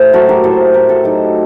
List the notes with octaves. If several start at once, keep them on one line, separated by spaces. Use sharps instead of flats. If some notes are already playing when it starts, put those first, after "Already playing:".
Already playing: A2 C5
F#3 F#4 A4
G4 A#4
A2 A4 C5
A2 G4 A#4
F#4 A4
F#3 D#4 G4